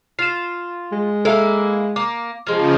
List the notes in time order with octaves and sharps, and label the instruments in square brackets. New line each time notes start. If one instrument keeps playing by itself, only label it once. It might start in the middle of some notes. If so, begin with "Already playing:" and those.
[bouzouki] F4 [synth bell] C7 E7
[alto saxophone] G#3
[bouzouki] A#3 E4 [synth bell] A4 E5 A#5
[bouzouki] A#3 [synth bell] D6
[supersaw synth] C#3 F3 [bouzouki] G#3 A#3